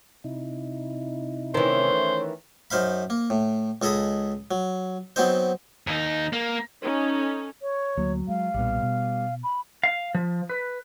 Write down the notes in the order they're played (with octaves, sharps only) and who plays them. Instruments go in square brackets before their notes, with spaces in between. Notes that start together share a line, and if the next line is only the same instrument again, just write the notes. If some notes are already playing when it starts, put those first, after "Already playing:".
[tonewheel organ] C3 D#4 E4
[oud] D#3 E3 [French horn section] A3 C#4 C#5 [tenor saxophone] C5
[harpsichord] F#2 D#4 C5 F5 B5
A#3
A2
C#2 G#4 A4 D#5 B5 D#6
F#3
F#3 B3 C4 D#4 C5
[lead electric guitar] D#2 D#4
A#3
[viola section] C#4 D#4 A4
[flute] C#5
[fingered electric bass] D2 A#3 [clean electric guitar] F#3
[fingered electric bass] G#3 [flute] F5
[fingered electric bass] B1 A#2 [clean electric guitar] G3 B3
[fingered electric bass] B2
[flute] B5
[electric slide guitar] F5
F3
B4